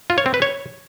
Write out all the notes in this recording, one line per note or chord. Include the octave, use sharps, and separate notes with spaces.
F4
C#5
C4
B4
C#5